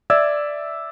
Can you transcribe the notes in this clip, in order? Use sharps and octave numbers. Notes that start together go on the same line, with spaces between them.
D5 E5 E6 G#6